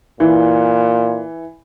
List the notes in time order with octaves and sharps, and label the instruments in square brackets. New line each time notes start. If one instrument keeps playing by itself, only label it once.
[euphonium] A#2 [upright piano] E3